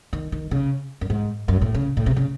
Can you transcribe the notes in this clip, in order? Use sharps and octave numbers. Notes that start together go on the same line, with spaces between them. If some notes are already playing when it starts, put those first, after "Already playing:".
D#3
D#3
C#3
F#2
G#2
F#2
A2
C#3
A2
C3
C#3